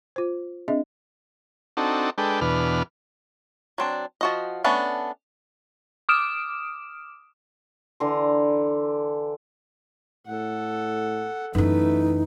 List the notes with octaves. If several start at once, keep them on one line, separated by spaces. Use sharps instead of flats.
F4 C5
C4 D4 G#4 D#5 E5
C4 D4 D#4 F#4 A4
G#3 D4 A4 B4 G5
E2 B2 D4 B4 F6
F#3 C4 D4
F3 F#4 D#5
A3 B3 C#4 D4
D6 D#6 F6 D7 E7
D3 E3 A#5 C6
A2 A4 F#5
F#2 E3 A3 D4 D#4 B4